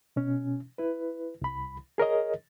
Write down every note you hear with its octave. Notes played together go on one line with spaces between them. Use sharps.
B2 C#4
E4 B4
C2 B5
G#4 A#4 C#5 D#5